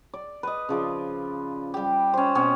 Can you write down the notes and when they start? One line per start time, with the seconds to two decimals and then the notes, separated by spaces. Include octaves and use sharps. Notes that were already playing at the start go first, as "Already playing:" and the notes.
0.14 D5
0.43 B4 D#5
0.69 C#3 F3 D5
1.74 G3 G4
2.13 C#4 C5
2.35 B2 C4 C#4